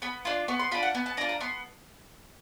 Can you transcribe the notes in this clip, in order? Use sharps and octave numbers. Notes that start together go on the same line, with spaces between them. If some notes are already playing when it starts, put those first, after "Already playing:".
B3 B5
D4 F4 C6
B3 C#6
C6
D4 F4 B5
F#5
B3
A5
D4 F4 A#5
A#5
B3 C6